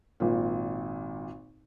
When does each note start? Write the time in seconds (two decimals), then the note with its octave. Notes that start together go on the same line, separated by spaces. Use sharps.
0.20 G#1 A#2